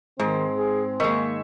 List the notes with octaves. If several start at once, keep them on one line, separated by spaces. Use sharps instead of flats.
G#2 D#3 G#3 C4
G#4
D#3 G#3 A#3 E5 C#6